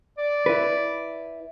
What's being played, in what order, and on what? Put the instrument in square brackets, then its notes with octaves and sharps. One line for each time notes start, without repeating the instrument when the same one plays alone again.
[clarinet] D5
[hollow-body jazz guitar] E4 B4